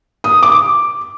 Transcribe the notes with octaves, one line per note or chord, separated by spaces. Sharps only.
D#6
D6